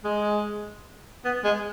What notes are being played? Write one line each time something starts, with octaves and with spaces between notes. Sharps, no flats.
G#3
B3
G#3